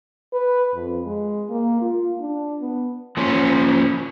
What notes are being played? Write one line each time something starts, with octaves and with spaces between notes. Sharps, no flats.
B4
F2
G#3
A#3
F4
D4
B3
F3 A#3 C#4